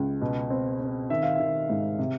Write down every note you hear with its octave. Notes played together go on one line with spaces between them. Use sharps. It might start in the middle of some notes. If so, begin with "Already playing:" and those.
Already playing: C#2
B2
C4
C4
D#3 E5
F5
D#3 E5
G#2
C3